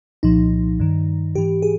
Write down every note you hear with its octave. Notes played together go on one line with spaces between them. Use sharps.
C2 A#2 F3 D#4
G2 D#3
G#2 E3 G4
G#4